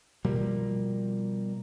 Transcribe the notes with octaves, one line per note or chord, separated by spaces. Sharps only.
B2 F3 G3 A#3